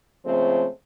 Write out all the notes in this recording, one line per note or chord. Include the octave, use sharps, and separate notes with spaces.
C#3 F3 G#3 A3 C4